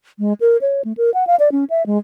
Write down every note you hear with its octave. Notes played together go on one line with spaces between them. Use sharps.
G#3
A#4
C#5
A3
A#4
F#5
F5
D5
C#4
E5
G#3